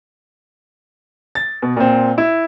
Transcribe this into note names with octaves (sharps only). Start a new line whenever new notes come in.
A6
B2
A#2 C4
E4